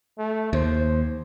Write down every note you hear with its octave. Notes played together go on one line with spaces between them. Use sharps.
A3
D#2 C5